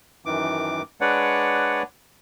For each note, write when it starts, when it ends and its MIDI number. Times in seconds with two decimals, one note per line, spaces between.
0.26 0.82 42
0.26 0.82 51
0.26 0.82 52
0.26 0.82 86
1.01 1.83 56
1.01 1.83 62
1.01 1.83 71
1.01 1.83 73
1.01 1.83 74
1.01 1.83 78